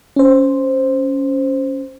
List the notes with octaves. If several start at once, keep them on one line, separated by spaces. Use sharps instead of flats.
C#4 C5